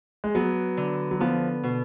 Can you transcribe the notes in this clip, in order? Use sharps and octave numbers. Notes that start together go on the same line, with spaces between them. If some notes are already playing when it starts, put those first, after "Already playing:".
G#3
F#3 B3
D3
F#3
F3 B3
B2